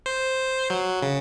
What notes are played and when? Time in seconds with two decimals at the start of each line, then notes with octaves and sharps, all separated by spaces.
0.06 C5
0.70 F#3
1.02 C#3